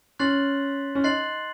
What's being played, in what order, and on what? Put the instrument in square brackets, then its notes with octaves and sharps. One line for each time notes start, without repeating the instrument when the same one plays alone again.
[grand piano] C#4 [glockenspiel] C6 F#6 A6 C7 F#7
[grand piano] C#4
[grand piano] D#4 [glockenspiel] C6 F#6 A6 C7 F#7